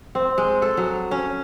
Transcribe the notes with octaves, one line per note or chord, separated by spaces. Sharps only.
C4
G#3
A4
F#3
C#4